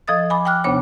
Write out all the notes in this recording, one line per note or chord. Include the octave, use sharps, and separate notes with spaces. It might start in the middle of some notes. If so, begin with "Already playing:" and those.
F3 A4 D#5 D#6 A6
G#5 B5 D6
G5 G#5 D6 F6 F#6
D#2 C3 B3 D4 C#5 D6